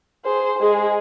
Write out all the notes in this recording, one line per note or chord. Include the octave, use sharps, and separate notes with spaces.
G#4 C5
G#3 G#4